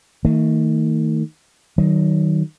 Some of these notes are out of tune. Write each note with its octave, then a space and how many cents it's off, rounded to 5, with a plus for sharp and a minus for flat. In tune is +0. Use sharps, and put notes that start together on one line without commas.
D#3 +30 A3 +45
D#3 +0 F#3 +30